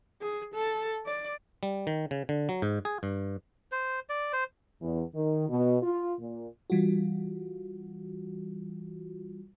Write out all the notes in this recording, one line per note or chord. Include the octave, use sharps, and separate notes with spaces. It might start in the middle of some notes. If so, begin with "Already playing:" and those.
G#4
A4
D5
G3
D#3
C#3
D3
F#3
G#2
G#4
G2
C5
D5
C5
E2
D#3
B2
F4
A#2
E3 G3 F4 F#4